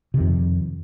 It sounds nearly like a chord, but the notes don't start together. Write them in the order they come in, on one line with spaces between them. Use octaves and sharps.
C3 D#3 F2